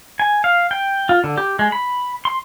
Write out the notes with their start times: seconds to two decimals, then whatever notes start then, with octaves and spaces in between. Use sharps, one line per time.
0.20 G#5
0.44 F5
0.71 G5
1.09 F4
1.24 D3
1.37 G4
1.59 G#3
1.72 B5
2.25 C6